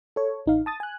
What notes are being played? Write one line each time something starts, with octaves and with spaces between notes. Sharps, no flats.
A4 C#5
A1 D#4 F5
A5 D#6 A6
G#5 F#6